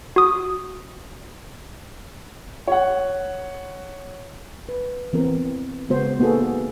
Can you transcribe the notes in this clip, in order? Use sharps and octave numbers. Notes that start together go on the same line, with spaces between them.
F#4 D#6
C#5 F#5
B4
E3 B3 C4 A#4
C#3 G#3 B3 F#4 C5
A#3 B3 D#4 F#4 G#4 A4